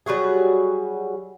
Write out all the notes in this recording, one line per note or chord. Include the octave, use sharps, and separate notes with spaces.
F#3 G3 F#4 G#4